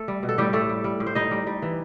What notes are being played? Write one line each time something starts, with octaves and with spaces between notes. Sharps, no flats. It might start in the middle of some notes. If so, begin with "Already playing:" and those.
Already playing: A3 A4
G3
B2
A4
A2 G3 G4
A2 A3 A4
G3
G3
A2
C5
G3 D#4 D#5
G3
G3
E3